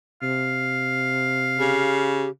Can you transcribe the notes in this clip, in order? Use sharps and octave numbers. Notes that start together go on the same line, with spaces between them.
C3 F5
C#3 G4